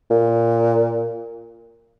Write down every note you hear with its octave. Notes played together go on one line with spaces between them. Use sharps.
A#2